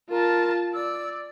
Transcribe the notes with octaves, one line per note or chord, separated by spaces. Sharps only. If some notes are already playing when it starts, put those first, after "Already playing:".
F4 A#4 A5
D5 E6